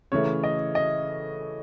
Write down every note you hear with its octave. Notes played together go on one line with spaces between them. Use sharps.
C#3 E3 A3 C#5
D#5
D#5